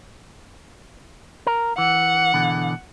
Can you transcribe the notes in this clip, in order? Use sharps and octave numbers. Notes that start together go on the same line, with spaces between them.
A#4
E3 F#5
B2 D3 E3